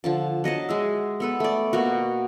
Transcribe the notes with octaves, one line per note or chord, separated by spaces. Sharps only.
D3 F3 A5
F#3 D#5 F#5 A5
G#3 G#4 E5
B3 A4 B4
A3 D5
B2 A#3 F#4